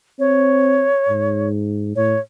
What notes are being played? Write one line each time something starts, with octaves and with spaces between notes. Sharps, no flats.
C4 C#5
G#2
A2 C#5